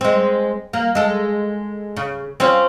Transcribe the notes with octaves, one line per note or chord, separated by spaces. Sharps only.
G#3 C4
A#3
G#3 A4
C#3
C4 C#4 F4